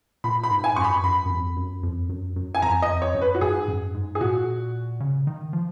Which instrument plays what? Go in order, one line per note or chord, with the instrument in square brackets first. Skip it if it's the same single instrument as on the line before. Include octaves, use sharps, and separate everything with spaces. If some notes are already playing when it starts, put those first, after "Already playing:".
[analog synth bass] A#2 [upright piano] B5
[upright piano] B5
[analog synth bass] G#2
[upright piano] G#5
[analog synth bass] F#2 [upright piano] C#6
[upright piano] B5
[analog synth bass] F#2 [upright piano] B5
[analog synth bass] F#2
F2
F#2
F2
F#2
F#2
[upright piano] G#5
[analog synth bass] F2 [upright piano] A#5
[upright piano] D#5
[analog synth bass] F2
[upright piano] C#5
[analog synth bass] F#2
[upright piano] B4
F#4
[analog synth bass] G#2 [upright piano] G#4
[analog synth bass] F#2
G#2
[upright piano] G#4
[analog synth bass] A#2 [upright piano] F#4
[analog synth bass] C#3
D#3
F3